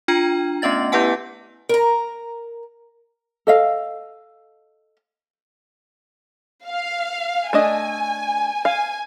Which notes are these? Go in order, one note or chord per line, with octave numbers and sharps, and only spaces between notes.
D4 F4 G5 A#5
A3 B3 C#4 D#5 A6
B3 E4 G4 B4 F#5 G#5
A#4 A#5
A4 D#5 F5
F5
A3 D4 D#5 G#5
F5 G#5